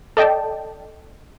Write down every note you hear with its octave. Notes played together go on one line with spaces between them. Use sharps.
A4 D5 D#5 G5 A5